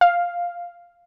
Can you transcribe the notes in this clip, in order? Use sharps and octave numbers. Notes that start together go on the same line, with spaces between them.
F5